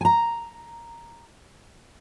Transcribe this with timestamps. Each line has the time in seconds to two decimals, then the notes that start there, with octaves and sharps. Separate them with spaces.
0.01 G#5 A#5